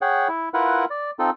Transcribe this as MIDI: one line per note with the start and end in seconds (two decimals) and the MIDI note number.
0.02 0.28 68
0.02 0.28 73
0.02 0.28 78
0.02 0.28 79
0.28 0.49 64
0.54 0.85 64
0.54 0.85 65
0.54 0.85 70
0.54 0.85 71
0.54 0.85 78
0.90 1.11 74
1.19 1.30 60
1.19 1.30 63
1.19 1.30 65
1.19 1.30 69